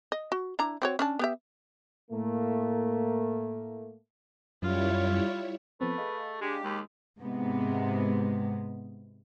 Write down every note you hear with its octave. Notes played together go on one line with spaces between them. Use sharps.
D#5
F#4
D4 E4 A#5
C4 F#4 C#5
C#4 D4 A5
B3 G4 E5
A2 A3 A#3
F#2 G3 E4 F4 C#5
F3 A3 B3 C4 B4
G#4 D#5 F5
G#3 D4 G4
D#2 G#3
G#2 C3 G#3 B3